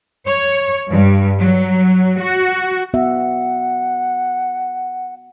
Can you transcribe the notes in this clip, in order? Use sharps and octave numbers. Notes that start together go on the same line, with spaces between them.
C#5
G2
F#3
F#4
B3 F#4 E5 F#5